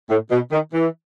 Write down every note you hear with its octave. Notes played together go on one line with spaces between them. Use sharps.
A2
B2
D#3
E3